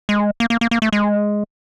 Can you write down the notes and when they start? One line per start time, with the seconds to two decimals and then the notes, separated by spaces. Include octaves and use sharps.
0.09 G#3
0.40 A#3
0.50 A#3
0.61 A#3
0.71 A#3
0.82 A3
0.93 G#3